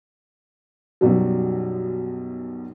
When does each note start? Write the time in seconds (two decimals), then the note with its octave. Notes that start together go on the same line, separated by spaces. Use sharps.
1.01 B1 F#2 F#3 G3